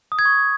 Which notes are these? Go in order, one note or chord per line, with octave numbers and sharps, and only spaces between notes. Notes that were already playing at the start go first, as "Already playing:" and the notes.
D#6
G#6
C#6